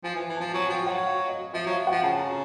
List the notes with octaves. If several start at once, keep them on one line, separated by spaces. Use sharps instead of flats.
F3 G#5
E3
G#5
E3
F3 A5
F#3 G#5
F3 G5
F#3 F#5
F5
D#5
F3 E5
F#3 F5
F3 F#5
C#3 A5
A#5